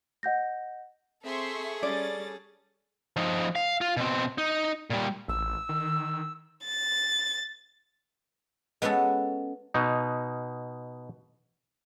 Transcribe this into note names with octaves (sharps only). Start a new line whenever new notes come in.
D#5 F#5 G6 A#6
C4 G#4 A4 E5 C6 C#6
G3 C#4 D5 A6
F3 D#4
F5
F4
B2 C4
D#4
A#2 G3
A1 E6
D#3
A6
G#3 B3 C#4 F#4 A4
B2 D#4